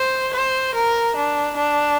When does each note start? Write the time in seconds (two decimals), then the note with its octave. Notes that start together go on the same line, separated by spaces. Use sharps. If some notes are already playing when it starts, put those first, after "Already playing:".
Already playing: C5
0.34 C5
0.75 A#4
1.16 D4
1.57 D4